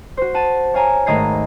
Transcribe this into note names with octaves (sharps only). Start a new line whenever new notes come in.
F#4 C5
F#5 A5 D#7
C#5 F5 G#5 A#5
G#1 A3 D#5 A#5 G#6 C7